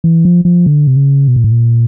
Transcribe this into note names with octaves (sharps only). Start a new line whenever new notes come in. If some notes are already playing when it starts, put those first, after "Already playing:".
E3
F3
F3
D3
C3
C#3
B2
A#2
A2
A#2